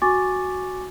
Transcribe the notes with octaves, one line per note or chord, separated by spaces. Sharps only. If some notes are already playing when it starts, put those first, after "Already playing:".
F#4 G#5 C#6 D6 A6